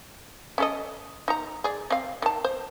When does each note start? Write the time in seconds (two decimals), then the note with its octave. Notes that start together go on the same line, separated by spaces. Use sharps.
0.58 C#4 A4 D#5
1.28 D#4 A#5
1.64 G#4 D5
1.90 C4 F5
2.22 D#3 A5
2.45 C5